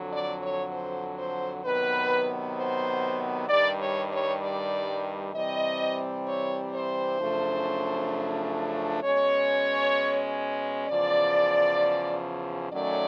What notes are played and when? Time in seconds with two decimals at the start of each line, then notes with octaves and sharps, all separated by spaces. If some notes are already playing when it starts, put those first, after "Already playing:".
Already playing: F2 D3 F#3
0.10 D5
0.41 C#5
0.72 C5
1.18 C5
1.65 C3 D#3 F#3 B3 B4
2.57 C5
3.49 G2 D#3 G3 D5
3.80 C#5
4.11 C#5
4.42 D5
5.34 C3 E3 G3 C4 D#5
6.26 C#5
6.73 C5
7.19 F#2 C#3 F3 A3 D4
9.03 B2 G#3 C#4 C#5
10.88 E2 C#3 F3 D5
12.73 F#2 D#3 F#3 A3 C#4 D5